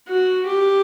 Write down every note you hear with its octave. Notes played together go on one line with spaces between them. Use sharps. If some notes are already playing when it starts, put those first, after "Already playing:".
F#4
G4